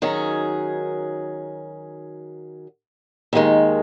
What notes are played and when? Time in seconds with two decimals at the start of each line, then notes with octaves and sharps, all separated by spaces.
0.02 D#3 F#3 C#4 G#4
3.33 D#2 D#3 G#3